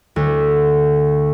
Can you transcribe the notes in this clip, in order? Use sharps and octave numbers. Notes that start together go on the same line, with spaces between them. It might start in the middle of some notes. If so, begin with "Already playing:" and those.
D2